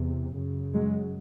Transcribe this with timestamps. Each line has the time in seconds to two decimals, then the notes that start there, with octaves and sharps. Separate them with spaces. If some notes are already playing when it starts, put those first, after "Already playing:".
Already playing: E2 C3
0.35 F#2 C#3
0.73 F#3 G#3